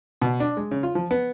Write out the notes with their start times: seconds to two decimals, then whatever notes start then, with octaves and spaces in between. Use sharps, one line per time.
0.22 B2
0.40 D4
0.57 G#3
0.71 C#3
0.83 F4
0.95 F3
1.11 B3